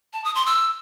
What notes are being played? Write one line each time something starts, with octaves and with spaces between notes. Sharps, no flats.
A5
D#6
C6
E6